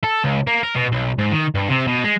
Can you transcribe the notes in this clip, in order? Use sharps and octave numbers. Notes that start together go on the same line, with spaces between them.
A4
C#2
A#3
A#4
B2
B1
G#2
D#3
G2
C3
B2
G#3